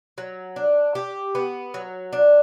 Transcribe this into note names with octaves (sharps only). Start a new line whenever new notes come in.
F#3
D4
G4
B3
F#3
D4